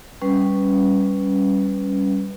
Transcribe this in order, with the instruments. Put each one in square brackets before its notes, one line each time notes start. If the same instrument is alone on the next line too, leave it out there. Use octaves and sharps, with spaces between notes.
[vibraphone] G3 C#4 B4